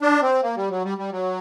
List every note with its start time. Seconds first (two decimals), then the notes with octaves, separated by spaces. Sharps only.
0.02 D4
0.22 C4
0.43 A#3
0.57 G3
0.71 F#3
0.84 G3
0.98 G3
1.12 F#3